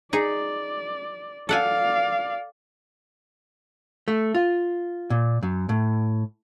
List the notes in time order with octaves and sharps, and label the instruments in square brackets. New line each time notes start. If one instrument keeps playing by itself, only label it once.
[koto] D#4 G#4 [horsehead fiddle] D5
[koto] A4 F#5 G#5 [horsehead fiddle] D5 F5
[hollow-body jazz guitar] A3
F4
A#2
F#2
A2